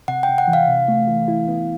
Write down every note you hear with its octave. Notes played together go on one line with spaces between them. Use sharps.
C3 F#5
G5
C3
F#5
E3
F5
C3
A3
E3
E4
B3